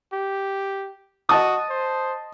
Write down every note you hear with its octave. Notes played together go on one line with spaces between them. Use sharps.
G4
F#4 D#5 A5 D#6
C5